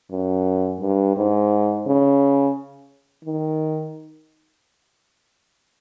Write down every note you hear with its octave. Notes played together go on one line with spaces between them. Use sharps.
F#2
G2
G#2
C#3
D#3